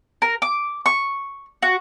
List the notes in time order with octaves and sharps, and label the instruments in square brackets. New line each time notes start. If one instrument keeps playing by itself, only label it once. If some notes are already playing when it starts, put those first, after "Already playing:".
[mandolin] A#4
D6
C#6
F#4